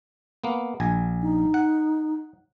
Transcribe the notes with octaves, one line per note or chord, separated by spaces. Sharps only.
A#3 B3
A#1 G#5
D#4
F#5